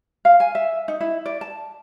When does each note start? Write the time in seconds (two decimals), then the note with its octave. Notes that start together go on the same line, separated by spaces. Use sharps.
0.25 F5
0.40 G#5
0.55 E5
0.88 D#4
1.00 E4
1.26 D5
1.41 A5